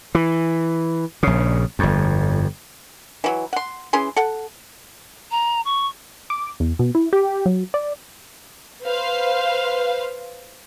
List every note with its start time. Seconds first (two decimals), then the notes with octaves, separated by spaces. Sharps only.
0.15 E3
1.23 A#1 C#3
1.79 G1 F2
3.24 E3 F#3
3.53 F#5 C6
3.93 E3 C#4 G#4 C6
4.16 A4 F#5
5.31 A#5
5.65 C#6
6.30 D6
6.60 E2
6.79 B2
6.95 E4
7.13 G4
7.46 F#3
7.74 D5
8.85 B4 C5 F5